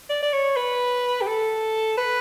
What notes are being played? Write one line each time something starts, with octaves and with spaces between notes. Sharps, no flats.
D5
D5
C#5
B4
G4
A4
B4